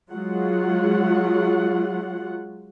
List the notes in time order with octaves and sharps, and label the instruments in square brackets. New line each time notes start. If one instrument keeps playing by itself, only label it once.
[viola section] F#3 G#3 F4 F#5